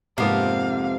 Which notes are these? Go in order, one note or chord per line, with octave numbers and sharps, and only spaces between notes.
F2 G#2 C3 A#3 B3 F5 A5